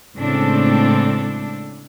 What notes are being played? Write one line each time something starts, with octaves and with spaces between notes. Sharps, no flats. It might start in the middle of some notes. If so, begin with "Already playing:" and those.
A2 C#3 G#3 C4 D4 A4